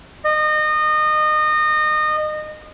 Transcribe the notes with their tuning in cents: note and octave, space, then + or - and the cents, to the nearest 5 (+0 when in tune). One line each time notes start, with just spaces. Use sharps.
D#5 -25